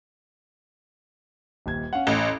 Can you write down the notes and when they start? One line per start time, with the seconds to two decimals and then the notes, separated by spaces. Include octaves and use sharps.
1.66 D#1 D#2 G#6
1.93 C#4 F5 F#5
2.07 A1 C#4